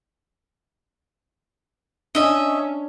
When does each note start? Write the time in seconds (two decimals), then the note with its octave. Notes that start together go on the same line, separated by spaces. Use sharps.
2.15 C#4 D4 D#5 E5